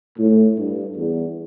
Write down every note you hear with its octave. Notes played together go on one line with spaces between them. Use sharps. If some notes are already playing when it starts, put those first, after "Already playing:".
A2
G2
E2